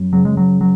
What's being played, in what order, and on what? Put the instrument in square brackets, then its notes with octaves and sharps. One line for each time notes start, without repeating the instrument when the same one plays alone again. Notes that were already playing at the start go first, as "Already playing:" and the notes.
Already playing: [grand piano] F#2
[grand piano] C#3 [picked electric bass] F#3
[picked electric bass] G#3
F#3
F#3